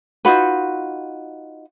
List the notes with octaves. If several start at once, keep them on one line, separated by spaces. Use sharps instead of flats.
D#4 F4 F#4 B4